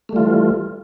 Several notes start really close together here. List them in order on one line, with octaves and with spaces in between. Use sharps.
A3 G3 F4 E3